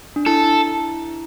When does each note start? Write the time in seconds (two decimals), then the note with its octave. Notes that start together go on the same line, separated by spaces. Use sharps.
0.16 D4
0.26 E4 A4